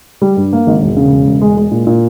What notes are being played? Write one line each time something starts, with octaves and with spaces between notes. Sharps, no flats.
G3
G2
A#3
G#1
E1
C#3
E1
E1
G#3
G#3
A#2
A#2